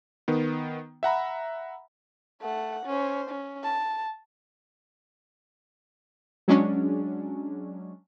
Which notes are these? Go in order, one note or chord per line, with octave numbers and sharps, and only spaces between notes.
D#3 B3
E5 F#5 A#5 B5
A3 F#5
C#4 C5
C#4
A5
F#3 G#3 C#4 D4